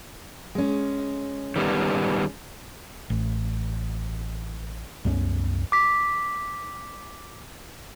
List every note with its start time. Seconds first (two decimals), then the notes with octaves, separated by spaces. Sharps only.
0.55 G#3 C#4
1.56 D#3 G3 B3
3.10 A1
5.05 C2 F#2 B3 C#4
5.72 D6 B6